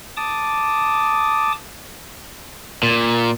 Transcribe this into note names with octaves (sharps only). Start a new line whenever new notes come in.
A5 D6 D#6
A#2